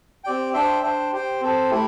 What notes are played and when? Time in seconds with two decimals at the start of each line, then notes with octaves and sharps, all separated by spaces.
0.24 C4 G4 D5 G5
0.54 D4 C5 E5 G5
0.82 D4 C5 G5
1.12 G4 C5 G5
1.41 C4 A4 C5
1.71 A3 E4 G4